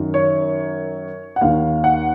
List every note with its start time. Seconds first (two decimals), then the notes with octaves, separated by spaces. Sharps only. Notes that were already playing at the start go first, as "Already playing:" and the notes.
Already playing: F#2 D#3
0.14 C#5
1.36 F#5
1.41 D#2 D#3 F5
1.84 F#5